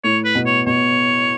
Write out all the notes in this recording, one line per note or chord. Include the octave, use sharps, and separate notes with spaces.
A2 C#5
B4
B2
C#5
B2 C#5